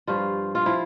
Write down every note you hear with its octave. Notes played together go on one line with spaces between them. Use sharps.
G2 F3 F4
F4
F3 E4